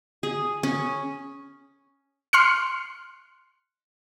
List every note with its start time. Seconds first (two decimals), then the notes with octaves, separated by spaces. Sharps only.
0.23 G#4
0.63 C#4
2.33 C6 F6 F#6 C#7